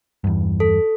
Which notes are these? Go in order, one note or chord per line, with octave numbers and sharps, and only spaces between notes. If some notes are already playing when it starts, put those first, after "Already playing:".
E2 G2
A4